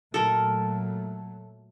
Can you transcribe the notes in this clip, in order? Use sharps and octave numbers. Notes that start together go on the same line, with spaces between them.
A#2 F#3 A3 A4 A#4